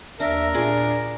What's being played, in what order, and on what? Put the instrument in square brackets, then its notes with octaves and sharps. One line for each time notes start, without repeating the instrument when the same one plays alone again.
[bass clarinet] D#2 [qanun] D4 [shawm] A#4 [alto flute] E5
[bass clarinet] A#2 [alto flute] D4 [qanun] F4 G#4 D5